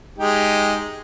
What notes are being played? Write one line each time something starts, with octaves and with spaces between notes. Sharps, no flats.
G#3 D#4 G4